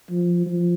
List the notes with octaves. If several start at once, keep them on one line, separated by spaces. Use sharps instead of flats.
F3
F3